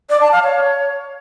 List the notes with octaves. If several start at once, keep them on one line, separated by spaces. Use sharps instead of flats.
D5
A5
F5
C#5